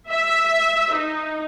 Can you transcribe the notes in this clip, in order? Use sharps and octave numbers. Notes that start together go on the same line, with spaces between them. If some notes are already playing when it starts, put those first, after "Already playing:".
E5
D#4